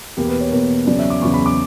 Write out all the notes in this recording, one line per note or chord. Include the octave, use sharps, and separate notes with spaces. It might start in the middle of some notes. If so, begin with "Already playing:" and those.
E2 B2 A#3 G4
B4
C#5
E2 B2 A#3
E2 C#3 F#3 D5
E5
D6
E2 C#3 F#3 C#6
B5
D6